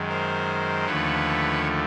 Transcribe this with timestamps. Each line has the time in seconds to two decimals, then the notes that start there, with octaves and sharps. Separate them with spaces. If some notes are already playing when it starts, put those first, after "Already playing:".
Already playing: F#2 D#3 G#3
0.09 A#4 C5
0.86 D#2 D3 F3 A3 B4 C#5